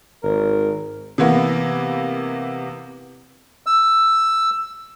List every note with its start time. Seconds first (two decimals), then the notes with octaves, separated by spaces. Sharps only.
0.23 G#1 A#4
1.18 C3 E3 A#3 B3
3.66 E6